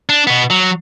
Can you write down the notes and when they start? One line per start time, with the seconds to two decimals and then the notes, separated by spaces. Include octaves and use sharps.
0.09 D4
0.27 B2 B3
0.50 F#3